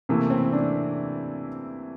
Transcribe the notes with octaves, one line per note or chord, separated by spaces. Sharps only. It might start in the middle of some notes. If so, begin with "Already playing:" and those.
C3 E3 A3 A#3 E4
C4
D4